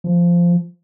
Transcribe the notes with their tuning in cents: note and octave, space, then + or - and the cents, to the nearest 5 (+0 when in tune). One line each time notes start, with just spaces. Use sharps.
F3 -10